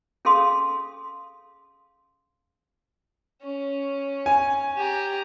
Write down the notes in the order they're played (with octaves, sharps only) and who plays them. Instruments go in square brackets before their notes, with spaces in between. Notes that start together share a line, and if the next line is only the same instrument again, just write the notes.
[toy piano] C#4 G#4 A4 F5 C6 D#6
[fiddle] C#4
[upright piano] G#5
[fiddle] G4 A#5